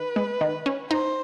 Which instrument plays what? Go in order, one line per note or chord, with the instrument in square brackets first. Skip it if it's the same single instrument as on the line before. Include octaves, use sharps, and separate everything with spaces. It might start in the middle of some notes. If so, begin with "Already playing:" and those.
Already playing: [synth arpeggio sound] D#3 [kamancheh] B4
[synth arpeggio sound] G#3
D#3
C#4
[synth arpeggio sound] D#4 [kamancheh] C5